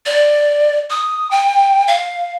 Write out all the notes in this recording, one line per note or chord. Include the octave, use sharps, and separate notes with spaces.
D5
D#6
G5
F5